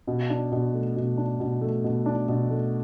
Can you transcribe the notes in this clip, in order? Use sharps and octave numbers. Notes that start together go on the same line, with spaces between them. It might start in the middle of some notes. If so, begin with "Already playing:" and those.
B2
D4
B2
A3
B2
D4
B2
A3
B2
D4
B2
A3